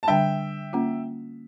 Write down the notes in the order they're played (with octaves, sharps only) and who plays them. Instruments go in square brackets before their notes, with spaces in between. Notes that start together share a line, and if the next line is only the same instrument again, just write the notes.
[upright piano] A5
[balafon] D3 G3 D4 [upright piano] E5 G5
[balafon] A#3 C#4 F4